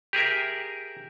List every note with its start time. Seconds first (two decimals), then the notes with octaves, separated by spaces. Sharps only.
0.13 G4 G#4 A#4 E5